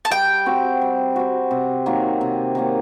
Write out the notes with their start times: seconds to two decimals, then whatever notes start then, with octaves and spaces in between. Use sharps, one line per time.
0.05 A5
0.10 G3 G5
0.46 C4 F#4
0.81 G3
1.16 C4 F#4
1.51 C3
1.86 D#3 F#3 A#3
2.21 C3
2.55 D#3 F#3 A#3